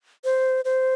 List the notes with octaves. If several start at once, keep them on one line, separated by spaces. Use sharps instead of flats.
C5
C5